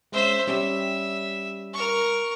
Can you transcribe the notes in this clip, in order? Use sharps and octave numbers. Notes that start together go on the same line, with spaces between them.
G#3 C#4 C5 E5
G3 C#4 G4 E5
A#4 C#6